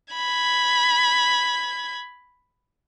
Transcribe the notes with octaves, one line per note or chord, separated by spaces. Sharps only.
B5 G#6